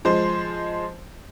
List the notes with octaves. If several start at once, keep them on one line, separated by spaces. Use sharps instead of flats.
F3 G#3 C5